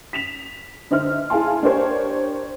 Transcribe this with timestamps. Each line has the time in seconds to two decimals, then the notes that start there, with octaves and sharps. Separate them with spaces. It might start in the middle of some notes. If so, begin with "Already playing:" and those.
0.13 B6 E7 F7
0.91 D3 D#4 C5 E5 F6
1.30 E4 G#4 F5 G#5 A5 C6
1.63 D4 G4 A#4 C5 C#5